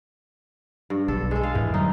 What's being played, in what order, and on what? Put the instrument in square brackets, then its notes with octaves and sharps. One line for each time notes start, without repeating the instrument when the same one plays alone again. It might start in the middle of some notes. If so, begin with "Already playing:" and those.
[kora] G2
[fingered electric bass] B1 [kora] A4
[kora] G#3 A4
F5
[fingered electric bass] F2 G#2 [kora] E3
[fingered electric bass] D3 F#3 G3 [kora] D#4